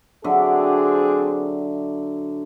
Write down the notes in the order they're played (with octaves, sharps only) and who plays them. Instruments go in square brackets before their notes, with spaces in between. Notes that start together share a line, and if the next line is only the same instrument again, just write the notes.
[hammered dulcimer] D3 F#3 E5 [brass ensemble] C4 D4 G#4